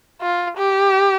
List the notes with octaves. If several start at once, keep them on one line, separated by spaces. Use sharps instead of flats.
F4
G4